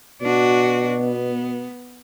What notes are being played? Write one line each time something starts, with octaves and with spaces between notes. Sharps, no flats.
B2 D4 F#4
B3